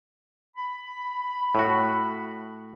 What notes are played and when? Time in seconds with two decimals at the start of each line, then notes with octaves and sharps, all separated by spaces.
0.56 B5
1.55 A2 F#4